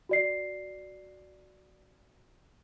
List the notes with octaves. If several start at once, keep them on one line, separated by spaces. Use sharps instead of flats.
F#4 D5 C7